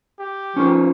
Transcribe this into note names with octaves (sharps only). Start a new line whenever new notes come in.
G4
F3 C#4 D#4 A#4